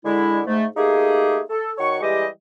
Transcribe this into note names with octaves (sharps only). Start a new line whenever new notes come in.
D3 G#3 E4
G#2 A3
A3 A#3 D#4 G4 G#4
A4
D#3 F#4 C#5 C#6
E3 G3 G#3 G4 D#5